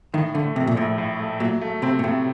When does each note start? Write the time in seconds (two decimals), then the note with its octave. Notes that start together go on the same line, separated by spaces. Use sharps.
0.14 A2 D#3
0.34 D3 A3
0.55 A#1 C3
0.67 A#2
0.76 A#1 A2
0.98 A2
1.20 A3
1.40 A#2 F#3
1.61 A3
1.82 C3 C4
1.99 A#2
2.04 A2 C3